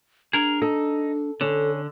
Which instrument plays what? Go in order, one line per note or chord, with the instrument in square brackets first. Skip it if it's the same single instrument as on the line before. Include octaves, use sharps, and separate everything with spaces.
[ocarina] D4 [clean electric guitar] G#4 A#4
[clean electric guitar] D#4 [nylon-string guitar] A4
[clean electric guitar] D3 [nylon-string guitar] C#4 [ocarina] A4